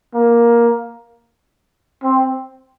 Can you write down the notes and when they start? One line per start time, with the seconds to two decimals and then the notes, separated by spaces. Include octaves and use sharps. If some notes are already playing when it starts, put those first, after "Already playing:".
0.14 A#3
2.03 C4